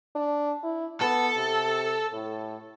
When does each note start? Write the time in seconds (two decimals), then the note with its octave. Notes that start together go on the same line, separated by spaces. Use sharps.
0.15 D4
0.63 E4
1.01 B3 A4
1.36 C3
2.13 A2